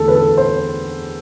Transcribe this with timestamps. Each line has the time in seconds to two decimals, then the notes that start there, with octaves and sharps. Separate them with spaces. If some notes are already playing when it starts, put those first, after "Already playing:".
Already playing: E2 D3 A3 A4
0.08 B4
0.15 A4
0.38 C5